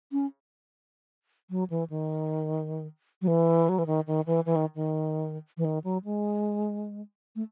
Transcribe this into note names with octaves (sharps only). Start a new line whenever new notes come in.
C#4
F#3
E3
D#3
F#3
E3
F#3
E3
D#3
D#3
E3
E3
D#3
D#3
E3
D#3
F#3
G#3
A3